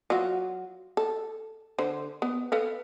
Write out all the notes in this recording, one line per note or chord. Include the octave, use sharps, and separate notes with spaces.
F#3 F4 F#4
A4
D3 C5
B3
A4 B4 F5